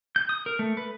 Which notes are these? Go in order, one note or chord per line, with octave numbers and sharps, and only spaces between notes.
G6
D#6
A#4
A3
B4